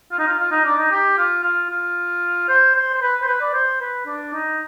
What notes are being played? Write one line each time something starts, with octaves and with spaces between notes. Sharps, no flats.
F4
D#4
F4
F4
D#4
D4
D#4
G4
F4
F4
F4
C5
C5
C5
B4
C5
B4
D5
C5
B4
D4
D#4